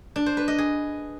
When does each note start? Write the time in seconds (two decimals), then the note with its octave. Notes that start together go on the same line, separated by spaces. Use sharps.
0.16 D4
0.26 C5
0.37 B4
0.48 D#5
0.58 G#4